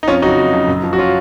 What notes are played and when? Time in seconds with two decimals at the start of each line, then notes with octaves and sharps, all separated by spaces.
0.03 D#4
0.08 F2 C#4 F4
0.22 C#3 F#3 D#4 F#4
0.37 F2
0.52 C#3 F#3
0.68 F#2
0.83 F3
0.93 F#4
0.98 C#4 F4